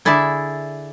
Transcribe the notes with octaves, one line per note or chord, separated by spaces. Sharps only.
D3 E4 G#4 D5 E5